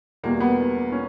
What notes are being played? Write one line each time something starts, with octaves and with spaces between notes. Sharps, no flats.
E2 B2 G3 A#3
B3
C#4